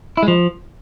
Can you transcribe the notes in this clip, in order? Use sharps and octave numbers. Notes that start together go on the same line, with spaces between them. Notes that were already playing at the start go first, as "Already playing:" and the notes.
E4
G#3
F3